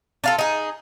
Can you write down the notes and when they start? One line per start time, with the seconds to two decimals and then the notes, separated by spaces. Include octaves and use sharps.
0.24 D4 F4 A4
0.38 D#4 G#4